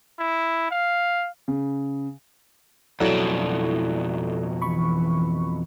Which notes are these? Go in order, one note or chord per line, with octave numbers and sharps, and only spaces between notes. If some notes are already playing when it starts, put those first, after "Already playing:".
E4
F5
C#3
F2 B2 F#3 E4 A4 D5
E3 B5 C#6